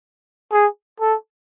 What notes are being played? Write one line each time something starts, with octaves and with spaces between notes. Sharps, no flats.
G#4
A4